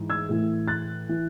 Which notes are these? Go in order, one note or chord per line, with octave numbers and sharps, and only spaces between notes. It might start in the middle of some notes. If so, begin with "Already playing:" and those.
Already playing: G#2 E3
E6 G#6
A2 E3
F#6 A6
E3